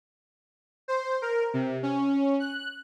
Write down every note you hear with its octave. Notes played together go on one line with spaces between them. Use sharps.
C5
A#4
C3
C#4
F#6